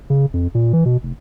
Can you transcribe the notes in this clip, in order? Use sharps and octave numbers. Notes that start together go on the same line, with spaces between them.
C#3
F2
A#2
E3
B2
F1